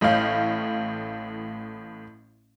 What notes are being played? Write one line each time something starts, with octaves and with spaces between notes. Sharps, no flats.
A1 A2 C#5 F5 G6